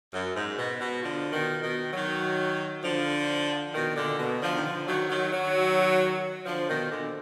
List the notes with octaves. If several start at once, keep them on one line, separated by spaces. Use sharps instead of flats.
F#2
G#2
B2
B2
D3 F3
B2 D#3
B2 D#3
D#3 F#3
D3 F3
B2 D#3
B2
A#2 D3
B2
D3 F3
D#3
D3 F3
D#3 F#3
D#3 F#3
D#3 F#3
D3 F3
B2 D#3
A#2 D3